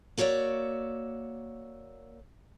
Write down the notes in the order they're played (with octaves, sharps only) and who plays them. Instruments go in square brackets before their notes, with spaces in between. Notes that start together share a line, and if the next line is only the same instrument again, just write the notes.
[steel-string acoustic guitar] A#3 F#4 C#5 D5 E5